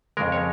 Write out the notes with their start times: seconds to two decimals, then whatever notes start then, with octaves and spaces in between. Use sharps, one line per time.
0.17 F2 C#3 G#3 A#4
0.32 C#5